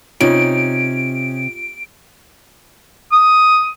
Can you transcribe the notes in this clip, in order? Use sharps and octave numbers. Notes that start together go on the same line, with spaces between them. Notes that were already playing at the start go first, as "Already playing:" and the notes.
C3 C#4 D#4 F4 D7
D#6